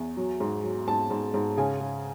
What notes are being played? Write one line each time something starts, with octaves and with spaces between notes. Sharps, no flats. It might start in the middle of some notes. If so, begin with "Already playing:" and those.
Already playing: E2
F#3
G#2
F#3
G#2 A5
G#2
G#2
C#3 G#5
C#3